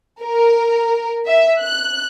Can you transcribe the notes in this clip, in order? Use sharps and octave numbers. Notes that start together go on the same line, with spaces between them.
A#4
E5
F#6